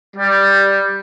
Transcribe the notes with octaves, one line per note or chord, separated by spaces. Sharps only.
G3